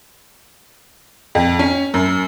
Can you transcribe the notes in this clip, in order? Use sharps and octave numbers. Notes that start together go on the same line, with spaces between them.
F2
C#4
F#2